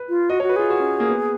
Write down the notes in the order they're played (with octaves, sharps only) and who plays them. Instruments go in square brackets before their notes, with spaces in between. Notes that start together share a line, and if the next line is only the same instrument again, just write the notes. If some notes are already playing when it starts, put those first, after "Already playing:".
Already playing: [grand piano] B4
[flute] F4
[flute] F#4 [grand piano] D#5
[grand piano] C#5
[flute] F#4
[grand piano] B4
[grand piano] F4 [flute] G#4
[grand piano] F#4
C#4
A#3
B3